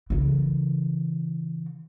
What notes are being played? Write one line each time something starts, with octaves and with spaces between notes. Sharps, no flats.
C#3 E3